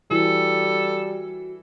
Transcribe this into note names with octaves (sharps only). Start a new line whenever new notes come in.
E3 G3 F#4 A4